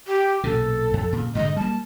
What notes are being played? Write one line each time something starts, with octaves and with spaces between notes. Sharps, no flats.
G4
B1 A#2 C#3 A4
F2
A#2 C#3
G#2 D3 G#3 D#5
G3 A#3 A5